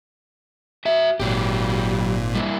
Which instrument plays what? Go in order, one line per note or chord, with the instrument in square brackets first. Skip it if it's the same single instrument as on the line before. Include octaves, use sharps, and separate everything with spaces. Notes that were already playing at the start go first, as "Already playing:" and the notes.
[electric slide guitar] F#4 E5
[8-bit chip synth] G#1 A#2 [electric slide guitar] F#3 G4
[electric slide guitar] G3 A#3 E4